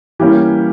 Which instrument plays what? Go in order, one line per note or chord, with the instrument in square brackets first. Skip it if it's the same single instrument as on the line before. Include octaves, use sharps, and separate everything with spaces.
[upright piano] E3 G3 A#3 C#4 G4